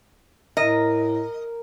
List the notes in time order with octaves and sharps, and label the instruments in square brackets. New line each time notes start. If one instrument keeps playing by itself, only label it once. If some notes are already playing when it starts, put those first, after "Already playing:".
[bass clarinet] A2 [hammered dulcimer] A#4 [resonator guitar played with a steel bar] D#5